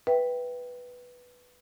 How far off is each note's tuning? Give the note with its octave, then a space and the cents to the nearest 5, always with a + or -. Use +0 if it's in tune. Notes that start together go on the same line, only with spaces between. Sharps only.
B4 +0 E5 +0 G5 +0